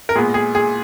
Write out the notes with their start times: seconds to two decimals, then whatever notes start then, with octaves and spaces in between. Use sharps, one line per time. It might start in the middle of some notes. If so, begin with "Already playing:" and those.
0.09 A#4
0.15 A#2 G#3 B3 G#4
0.34 G#4
0.55 G#4